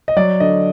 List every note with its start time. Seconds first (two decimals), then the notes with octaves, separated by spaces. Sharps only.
0.08 D#5
0.16 F#3 D5
0.40 D3 D#5